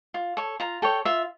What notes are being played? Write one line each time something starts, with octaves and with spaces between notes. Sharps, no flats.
F4
A4 C#5
F4 A#5
A4 C#5 G5
F4 E5